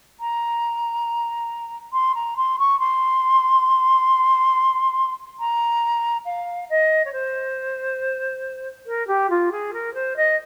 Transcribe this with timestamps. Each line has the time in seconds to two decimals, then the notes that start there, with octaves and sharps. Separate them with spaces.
0.20 A#5
1.93 C6
2.15 A#5
2.37 C6
2.59 C#6
2.79 C6
5.39 A#5
6.26 F5
6.70 D#5
7.05 C#5
7.13 C5
8.86 A#4
9.07 G4
9.30 F4
9.52 G#4
9.73 A#4
9.94 C5
10.16 D#5